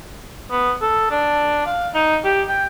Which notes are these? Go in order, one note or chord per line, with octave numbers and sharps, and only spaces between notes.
B3
A4
D4
F5
D#4
G4
G5